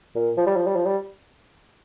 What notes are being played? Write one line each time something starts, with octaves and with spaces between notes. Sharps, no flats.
A#2
F3
G3
F3
G3
F3
G3